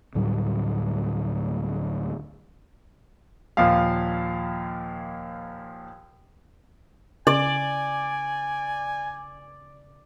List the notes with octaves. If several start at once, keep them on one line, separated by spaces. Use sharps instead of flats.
D2 A2 F#3 G3
D#2 A#2 F3 F5
C#3 D5 G#5